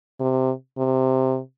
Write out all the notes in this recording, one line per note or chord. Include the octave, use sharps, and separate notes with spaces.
C3
C3